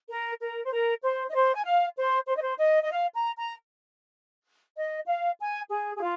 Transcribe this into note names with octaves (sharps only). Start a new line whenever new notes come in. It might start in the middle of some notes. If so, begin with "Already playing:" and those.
A#4
A#4
C5
A#4
C5
D#5
C5
G#5
F5
C5
C5
D#5
C5
D#5
D#5
F5
A#5
A#5
D#5
F5
G#5
G#4
G#4
F4